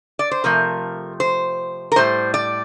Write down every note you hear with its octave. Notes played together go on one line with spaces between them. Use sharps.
D5
C5
C3 F3 A3 A#4
C5
A#4
A2 G3 C5
D5